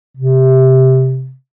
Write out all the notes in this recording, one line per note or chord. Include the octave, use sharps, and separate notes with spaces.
C3